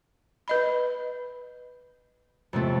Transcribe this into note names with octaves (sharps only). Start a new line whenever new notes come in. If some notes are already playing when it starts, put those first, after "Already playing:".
B4 D#5 B5
F2 C3 A3